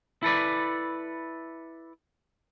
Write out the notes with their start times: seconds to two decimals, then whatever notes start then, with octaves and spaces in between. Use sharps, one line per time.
0.23 E4 A4 B4 D5